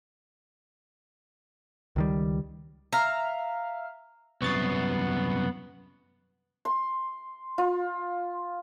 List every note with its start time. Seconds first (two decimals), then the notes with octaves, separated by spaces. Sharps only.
1.96 C#2 D#3 G3
2.93 E5 F5 A#5 F6
4.42 C2 F#2 B3 C#6 A6 C7
6.65 C6
7.58 F4